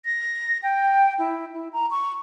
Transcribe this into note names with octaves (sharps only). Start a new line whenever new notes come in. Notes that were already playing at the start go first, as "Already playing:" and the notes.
A#6
G5
E4
E4
A#5
C#6